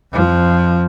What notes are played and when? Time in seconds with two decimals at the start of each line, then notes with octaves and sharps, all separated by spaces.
0.12 F2 F3